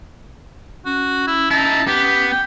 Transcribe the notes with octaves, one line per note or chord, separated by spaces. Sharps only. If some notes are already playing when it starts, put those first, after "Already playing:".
C#4 F#4
E4
D#4 E4 A5
B3 G4
G5